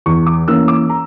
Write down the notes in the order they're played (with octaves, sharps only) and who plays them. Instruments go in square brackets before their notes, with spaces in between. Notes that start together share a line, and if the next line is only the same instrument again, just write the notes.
[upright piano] E2 C#6
D6
E3 A#3 C#4 E6
D6
A#5